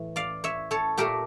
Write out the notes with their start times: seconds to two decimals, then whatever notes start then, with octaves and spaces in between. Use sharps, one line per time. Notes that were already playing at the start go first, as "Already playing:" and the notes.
Already playing: A2 E3
0.16 D5 F5
0.44 C#5 E5
0.71 A4 C#5
0.98 A#2 A3 G4 A#4